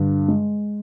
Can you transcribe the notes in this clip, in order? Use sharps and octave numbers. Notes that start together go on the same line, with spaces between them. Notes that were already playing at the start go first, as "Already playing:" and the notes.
Already playing: G2 D3
G#3